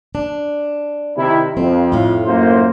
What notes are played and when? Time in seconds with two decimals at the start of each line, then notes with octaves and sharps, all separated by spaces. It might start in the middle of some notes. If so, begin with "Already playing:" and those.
0.15 D4
1.18 C3 D#3 E4
1.57 F2 C4
1.92 A2 F4
2.26 F#2 A#3 C5